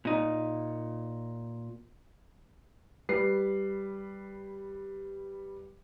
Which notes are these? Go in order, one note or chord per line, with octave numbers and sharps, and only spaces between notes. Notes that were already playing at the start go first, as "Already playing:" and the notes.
A#2 D#4
G3 B4 C7